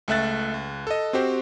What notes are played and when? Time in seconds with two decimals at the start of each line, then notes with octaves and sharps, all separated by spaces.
0.08 C#2 A3 E5 F#6 A6
0.54 C#2
0.87 A4 D#5
1.13 C4 F#4 G4 C5